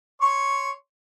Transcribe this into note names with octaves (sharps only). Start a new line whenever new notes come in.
C#5 C6 C#6